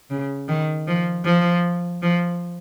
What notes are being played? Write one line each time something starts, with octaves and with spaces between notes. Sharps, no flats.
C#3
D#3
F3
F3
F3